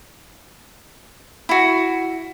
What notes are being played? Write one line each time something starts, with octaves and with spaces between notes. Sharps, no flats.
E4 F#4